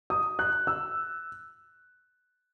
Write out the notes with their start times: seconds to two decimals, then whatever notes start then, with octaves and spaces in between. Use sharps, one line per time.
0.10 D#6
0.39 F#6
0.67 E6